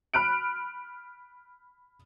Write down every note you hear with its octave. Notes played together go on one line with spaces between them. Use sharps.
B5 F6 F#6 D7